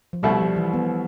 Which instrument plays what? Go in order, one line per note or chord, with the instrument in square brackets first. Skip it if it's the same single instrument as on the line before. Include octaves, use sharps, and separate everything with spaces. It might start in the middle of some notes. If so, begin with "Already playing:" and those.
[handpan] F3
[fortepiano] C2 B2 A3 E4 [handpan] G3
[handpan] F3
E3
B3